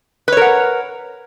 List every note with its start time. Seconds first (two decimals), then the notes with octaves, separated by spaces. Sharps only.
0.28 B4
0.32 C#5
0.37 A#4
0.42 F#5